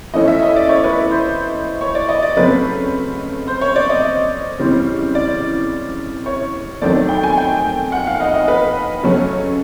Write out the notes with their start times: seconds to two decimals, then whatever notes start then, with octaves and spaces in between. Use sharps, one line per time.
0.14 E3 A3 C#4 D#5
0.28 E5
0.42 D#5
0.56 D5
0.69 C#5
0.84 B4
1.11 C5
1.81 C#5
1.95 D5
2.09 D#5
2.23 D5
2.37 C#3 F#3 A3 C4 B4
3.48 C5
3.61 C#5
3.76 D5
3.89 D#5
4.59 C#3 E3 G3 C4
5.15 D5
6.26 C#5
6.81 D#3 F#3 A3 C4 D5
7.09 G5
7.23 G#5
7.37 G5
7.92 F#5
8.07 F5
8.20 D#5
8.34 D#5
8.48 B4
9.03 C#3 F#3 A3 C#4